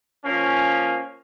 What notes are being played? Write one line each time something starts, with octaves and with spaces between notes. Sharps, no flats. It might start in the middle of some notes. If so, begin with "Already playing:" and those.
F3 A#3 C#4